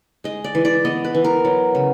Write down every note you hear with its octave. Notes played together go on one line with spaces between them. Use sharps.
G#3 D#5
D5
E3
D5
B3 D#5
B4
E3
A#4
F#3
C#3